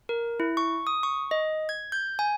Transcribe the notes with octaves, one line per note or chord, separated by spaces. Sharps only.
A#4
E4
C#6
D#6
C#6
D#5
G#6
G6
G#5